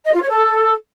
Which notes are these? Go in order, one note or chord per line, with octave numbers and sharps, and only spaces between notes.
D#5
F4
C#5
A4